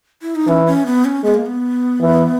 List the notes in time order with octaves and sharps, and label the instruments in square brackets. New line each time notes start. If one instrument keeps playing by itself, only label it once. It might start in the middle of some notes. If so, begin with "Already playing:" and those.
[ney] E4
D#4
[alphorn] E3 [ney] C#4
[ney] C#4
B3
C#4
[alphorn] G#3 [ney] B3
[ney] A#3
B3
[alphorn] E3